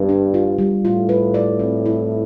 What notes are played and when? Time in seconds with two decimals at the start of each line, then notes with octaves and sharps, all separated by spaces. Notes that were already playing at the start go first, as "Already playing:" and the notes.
Already playing: G2 B3
0.09 D4
0.34 F4
0.58 G3
0.84 A2 F4
1.09 B4
1.34 D5
1.59 C4
1.86 E4